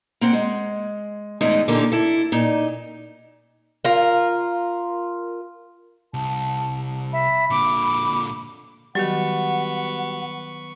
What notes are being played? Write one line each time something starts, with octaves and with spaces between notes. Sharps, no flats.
A#3 C4 F#5
G#3
E2 A2 G#3 D#4 D#5
A#2 D3 E3 A#3 D#4 G4
E4 A4
A#2 D#4
F4 A#4
C2 A5
E5 B5
A#2 D3 D6
D#3 F#3 G3 B3 F#4 G4 F#5 C#6